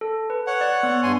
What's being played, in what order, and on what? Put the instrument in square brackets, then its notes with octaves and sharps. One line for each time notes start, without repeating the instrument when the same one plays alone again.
[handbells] A4
B4
[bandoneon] C#5 F#5
[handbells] D5
B3
[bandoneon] G2 G#5 C6